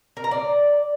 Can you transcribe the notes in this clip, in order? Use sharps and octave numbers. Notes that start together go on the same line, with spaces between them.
A#4
A#5
D5